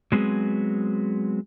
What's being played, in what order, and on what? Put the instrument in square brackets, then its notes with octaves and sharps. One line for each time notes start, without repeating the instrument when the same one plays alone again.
[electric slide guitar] F#3 G#3 B3 C4 G#4